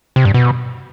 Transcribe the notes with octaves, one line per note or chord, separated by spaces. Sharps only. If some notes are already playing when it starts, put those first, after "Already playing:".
C3
G2
B2